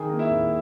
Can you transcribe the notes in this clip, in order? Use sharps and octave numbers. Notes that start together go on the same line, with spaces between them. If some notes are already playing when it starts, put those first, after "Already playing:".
Already playing: D#3 G#4 G#5
A#3
E4 E5
D#2